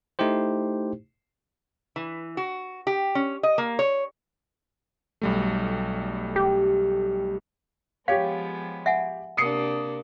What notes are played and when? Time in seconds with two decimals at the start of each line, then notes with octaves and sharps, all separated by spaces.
0.19 A3 D#4 E4 G4 C5
1.96 E3
2.37 F#4
2.87 G4
3.15 C#4
3.43 D#5
3.58 A#3
3.79 C#5
5.22 B1 G3 A3
6.36 G4
8.08 F3 G#3 B3 G4 C#5 F5
8.86 E5 F#5 G#5
9.37 C3 A#3 D4 D#6 C7 C#7